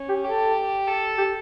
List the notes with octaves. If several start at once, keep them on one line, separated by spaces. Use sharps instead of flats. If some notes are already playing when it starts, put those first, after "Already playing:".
Already playing: C#4
G4
G4 A4
A4
G4